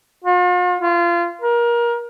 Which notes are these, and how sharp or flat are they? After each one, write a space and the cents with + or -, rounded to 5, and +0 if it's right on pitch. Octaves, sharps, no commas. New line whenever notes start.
F4 +45
F4 -25
A#4 +25